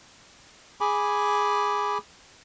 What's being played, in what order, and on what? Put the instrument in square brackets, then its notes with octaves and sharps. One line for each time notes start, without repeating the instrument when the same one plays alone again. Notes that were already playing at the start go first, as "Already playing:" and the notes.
[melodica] G#4 G#5 B5 D6